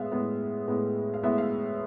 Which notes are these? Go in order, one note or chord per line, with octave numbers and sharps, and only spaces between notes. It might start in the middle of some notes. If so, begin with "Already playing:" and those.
Already playing: A2 G#3 B3 E5 F5
A2 G#3 B3
A2 G#3 B3
F5
A2 G#3 B3 E5
F5